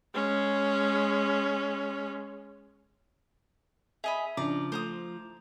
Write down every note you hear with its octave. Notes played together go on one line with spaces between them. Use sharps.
G#3 C#4
G#4 D#5 E5 B5
C#3 F3 D4 A#5 D6
A3 C5 A#5 D#6